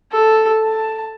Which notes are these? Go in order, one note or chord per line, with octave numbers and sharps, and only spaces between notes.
A4
A5